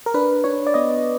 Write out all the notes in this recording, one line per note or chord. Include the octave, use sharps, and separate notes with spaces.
A#4
D4 B4
D4 C#5
D5
B3 D#5